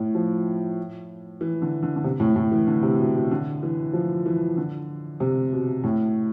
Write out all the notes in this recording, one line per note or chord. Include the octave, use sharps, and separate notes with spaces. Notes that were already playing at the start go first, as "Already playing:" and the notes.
Already playing: A2
F3
E3
D3
D3
D3
C3
A2
A2
E3
D3
C3
B2
B2
D3
E3
F3
E3
D3
C3
B2
A2